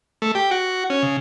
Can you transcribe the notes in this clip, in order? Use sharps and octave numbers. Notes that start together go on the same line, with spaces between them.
A3
G4
F#4
C#4
C#3